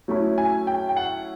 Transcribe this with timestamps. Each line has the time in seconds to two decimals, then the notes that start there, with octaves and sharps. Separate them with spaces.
0.08 F#3 A3 C#4 E4
0.38 G#5
0.67 G5
0.89 G5
0.97 F#5